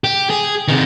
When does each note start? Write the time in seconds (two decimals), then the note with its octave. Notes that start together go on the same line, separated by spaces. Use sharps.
0.04 G4
0.30 G#4
0.68 C3 D#3